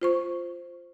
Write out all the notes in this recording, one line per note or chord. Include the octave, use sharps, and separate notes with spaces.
F4 C5 C#6